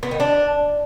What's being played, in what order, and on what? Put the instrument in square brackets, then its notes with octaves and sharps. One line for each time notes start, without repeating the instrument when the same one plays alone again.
[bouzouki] B3
D#3
D4